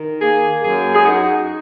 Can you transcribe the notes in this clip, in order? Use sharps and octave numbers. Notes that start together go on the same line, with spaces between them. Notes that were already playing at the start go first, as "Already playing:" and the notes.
Already playing: D#3
A#3 G#4
F#2 G#4
G#4
D#4 F#4